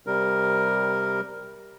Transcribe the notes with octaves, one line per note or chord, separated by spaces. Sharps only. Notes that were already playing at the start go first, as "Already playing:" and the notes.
C3 G3 A#4